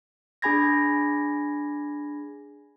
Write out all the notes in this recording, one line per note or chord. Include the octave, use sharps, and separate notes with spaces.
D4 G#4 G#5 B5 G#6 A#6